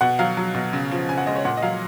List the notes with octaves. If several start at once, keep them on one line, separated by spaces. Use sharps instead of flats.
B2 F#5
F#3 F5
F#3
B2
C#3
F3
C#3 G#5
F#5
G#3 D#5
C#5
A#2 F#5
D#5
F#3 F5